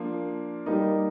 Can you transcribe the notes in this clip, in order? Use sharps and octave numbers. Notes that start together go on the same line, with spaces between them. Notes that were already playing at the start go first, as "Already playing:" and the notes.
Already playing: F3 A#3 D4
G3 A#3 D#4